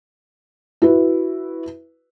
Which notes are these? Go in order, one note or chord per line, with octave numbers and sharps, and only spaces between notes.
E4 F#4 B4